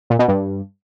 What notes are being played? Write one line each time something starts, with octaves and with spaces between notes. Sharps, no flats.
A#2
B2
G2